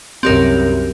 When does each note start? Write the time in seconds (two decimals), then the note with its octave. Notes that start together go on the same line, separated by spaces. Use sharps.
0.23 C2 F#2 C4 G4 A#4